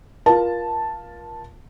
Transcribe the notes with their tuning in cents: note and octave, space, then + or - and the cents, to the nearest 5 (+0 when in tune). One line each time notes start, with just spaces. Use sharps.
F4 +0 A#4 +30 A5 +0